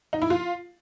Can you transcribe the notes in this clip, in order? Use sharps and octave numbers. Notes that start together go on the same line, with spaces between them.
D#4
E4
F4